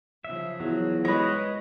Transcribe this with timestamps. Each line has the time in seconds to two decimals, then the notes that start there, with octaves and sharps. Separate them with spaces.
0.25 C#3 F3 E5
0.60 E2 F#3
1.05 G#3 B4 C#5 D#5